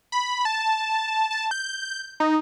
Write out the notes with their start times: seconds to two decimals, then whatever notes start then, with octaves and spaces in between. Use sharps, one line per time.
0.12 B5
0.45 A5
1.31 A5
1.51 G6
2.20 D#4